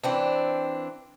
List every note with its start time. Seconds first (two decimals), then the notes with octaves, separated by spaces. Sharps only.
0.03 E3 C4 D4